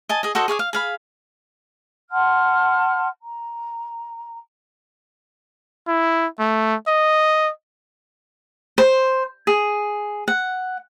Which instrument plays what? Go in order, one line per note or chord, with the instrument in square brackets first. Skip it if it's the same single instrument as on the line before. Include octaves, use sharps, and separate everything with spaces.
[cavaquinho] D#5 G#5 A5
G#4 D#5
F#4 A4 C5 D#5
G#4 C#5 F5 D6
F5
G#4 F5 B5
[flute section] F#5 A5 C6 F6
A#5
[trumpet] E4
A3
D#5
[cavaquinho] C5
G#4
F#5